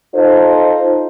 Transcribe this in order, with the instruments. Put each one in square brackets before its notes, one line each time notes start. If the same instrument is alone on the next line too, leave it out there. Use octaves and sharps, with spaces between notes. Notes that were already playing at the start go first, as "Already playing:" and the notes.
[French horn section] D#4 F4 A4 C5